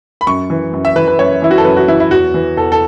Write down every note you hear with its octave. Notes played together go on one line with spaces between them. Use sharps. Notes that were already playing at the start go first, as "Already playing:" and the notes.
B5
F#2 C#6
E3
F#2
E5
E3 B4
B4
F#2 C#5
E3 E4
F#4
A4
F#2 B4
F#4
E3 E4
E4
E2 F#4
E3
E2 A4
A4